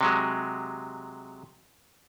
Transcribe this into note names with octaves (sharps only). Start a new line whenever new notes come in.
C3 F#3 G#3